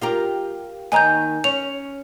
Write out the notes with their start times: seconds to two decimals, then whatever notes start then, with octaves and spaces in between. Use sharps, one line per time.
0.01 F4 G4 A#4
0.92 D#2 D#3 D#5 G#5 A#5 G6
1.44 C#4 F7